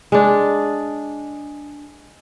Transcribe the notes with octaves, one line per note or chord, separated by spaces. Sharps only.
G#3 D4